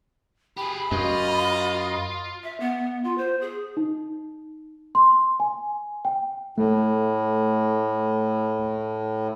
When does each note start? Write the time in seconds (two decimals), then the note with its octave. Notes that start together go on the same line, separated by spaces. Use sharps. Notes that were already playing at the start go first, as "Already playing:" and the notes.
0.57 G4 G#4 B5
0.92 F#2 F4 D#5
2.43 E5
2.60 B3
3.04 F4
3.18 C5
3.41 G#4
3.77 D#4
4.95 C6
5.40 G#5
6.05 G5
6.58 A2 A3